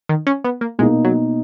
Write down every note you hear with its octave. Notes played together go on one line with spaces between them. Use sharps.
D#3
C#4
B3
A#3
B2 G#3 A#3 D#4
F#3